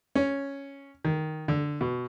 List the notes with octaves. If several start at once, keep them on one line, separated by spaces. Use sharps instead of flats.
C#4
D#3
D3
B2